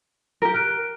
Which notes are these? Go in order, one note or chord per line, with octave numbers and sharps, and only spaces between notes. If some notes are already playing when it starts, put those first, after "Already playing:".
G4 A#4
F6 F#6 D7